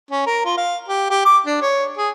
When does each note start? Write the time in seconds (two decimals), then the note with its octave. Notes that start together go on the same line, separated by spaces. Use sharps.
0.11 C#4
0.26 A#4
0.45 F4
0.57 F5
0.88 G4
1.10 G4
1.25 D6
1.46 D4
1.62 C#5
1.97 G#4